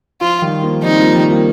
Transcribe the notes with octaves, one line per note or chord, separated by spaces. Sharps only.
F3 F4
D#3 G3
F3 A#3
G3 C4 D#4
F3 A#3
D#3 G3
F3 A#3